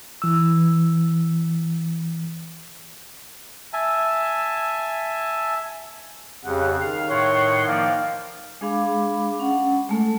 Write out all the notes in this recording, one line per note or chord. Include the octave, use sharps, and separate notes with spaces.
E3 E6
E5 G#5 A5
F2 C#3 G3 F#5
D#3 F5
A2 C#5 F#5 C6
F3 A#3 D5 F5
G#3 D4 G#4 F5 B5 D6
C#4 F#5
G#3 A3 A4